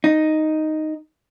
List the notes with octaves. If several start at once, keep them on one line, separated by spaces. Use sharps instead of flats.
D#4